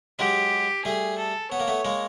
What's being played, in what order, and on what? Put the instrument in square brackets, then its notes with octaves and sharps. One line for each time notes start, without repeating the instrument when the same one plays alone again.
[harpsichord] F#3 G#3 [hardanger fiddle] G4
[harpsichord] G3 A3 [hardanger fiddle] G#4
[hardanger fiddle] A4
[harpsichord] B3 [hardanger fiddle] C#5
[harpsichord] A#3
A3 B3
G#3 A#3